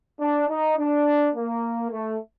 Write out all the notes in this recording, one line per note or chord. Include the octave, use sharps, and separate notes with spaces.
D4
D#4
D4
A#3
A3